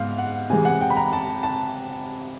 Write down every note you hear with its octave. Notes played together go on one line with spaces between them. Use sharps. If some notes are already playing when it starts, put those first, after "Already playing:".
Already playing: G#2 B3 F5
F#5
C3 E3 G#3 G#5
F#5
G5
B5
A#5
A5
A5